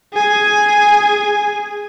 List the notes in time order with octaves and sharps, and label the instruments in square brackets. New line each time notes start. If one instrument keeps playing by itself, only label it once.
[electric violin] G#4 G#5